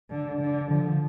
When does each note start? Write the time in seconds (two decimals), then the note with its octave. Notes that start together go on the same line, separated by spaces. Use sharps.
0.09 D3
0.40 D3
0.70 D3 F3